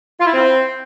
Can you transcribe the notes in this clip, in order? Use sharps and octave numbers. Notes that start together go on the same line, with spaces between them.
F4
E4
C4